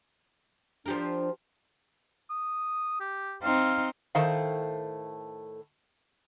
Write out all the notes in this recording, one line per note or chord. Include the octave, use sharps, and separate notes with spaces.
F3 D4 G4 A#4
D#6
G4
C4 D#4 F5
A2 D#3 A3 C5 F5